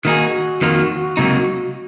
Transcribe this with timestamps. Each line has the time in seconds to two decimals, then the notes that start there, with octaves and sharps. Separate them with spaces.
0.04 D#3 A#3 D#4 F#4 G#4
0.62 F2 D#3 A#3 F4
1.17 C#2 C3 F#3 A#3 D#4